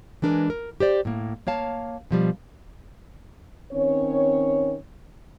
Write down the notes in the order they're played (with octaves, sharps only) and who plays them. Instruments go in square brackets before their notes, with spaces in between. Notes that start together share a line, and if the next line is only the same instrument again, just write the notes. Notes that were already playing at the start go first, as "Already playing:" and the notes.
[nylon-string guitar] E3 G#3 D4 A#4 B4
A#4
G4 C5 D5
A2 A#3
A#3 C#5 F5 A5
B2 F3 G3
[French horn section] D#3 C4 C#4 C#5